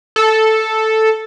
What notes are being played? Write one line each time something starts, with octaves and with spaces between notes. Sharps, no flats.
A4